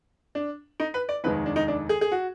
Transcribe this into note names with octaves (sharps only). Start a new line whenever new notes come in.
D4
D#4
B4
D5
F1 D#2 D#3 G#3 B4
D4
D#4
D4
G#4
G#4
F#4